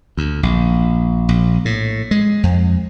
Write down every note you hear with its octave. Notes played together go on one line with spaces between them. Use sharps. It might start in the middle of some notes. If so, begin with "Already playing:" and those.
D2
A#1
A#1
A2
G#3
F2